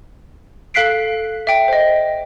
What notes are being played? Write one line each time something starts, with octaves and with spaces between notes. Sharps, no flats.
A4 F5 F#6 B6 C7 D7
E5 G5
C5 D#5